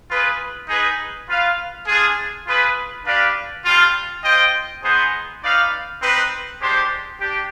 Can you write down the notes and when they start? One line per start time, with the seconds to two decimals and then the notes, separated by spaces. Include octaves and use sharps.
0.09 F4 G#4 B4
0.68 D#4 G#4 B4
1.28 F4 B4 F5
1.87 D4 F4 G#4
2.46 F4 G#4 B4
3.06 D4 G4 B4 D5 F5
3.65 G3 D4 F4
4.24 F4 C5 D#5 G5
4.83 B3 D#4 G#4 C5
5.43 D#4 B4 D5 F5
6.02 C4 D#4 B4
6.61 G#3 D4 G4 C5
7.20 D4 G4